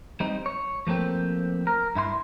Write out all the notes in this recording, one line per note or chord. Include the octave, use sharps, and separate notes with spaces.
G3 C4 D#4
C#5
F3 A3 A#3 C4 G4
A#4
G2 E4 G#4 C6